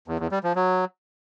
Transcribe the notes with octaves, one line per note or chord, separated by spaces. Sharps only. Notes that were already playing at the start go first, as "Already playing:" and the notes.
E2
E2
G3
F3
F#3